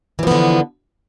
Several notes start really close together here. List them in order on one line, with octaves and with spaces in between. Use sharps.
E3 F3 B3 D3